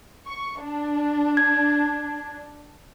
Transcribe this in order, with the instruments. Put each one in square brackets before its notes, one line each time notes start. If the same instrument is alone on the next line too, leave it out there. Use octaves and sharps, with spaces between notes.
[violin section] C#6
D4
[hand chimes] G#6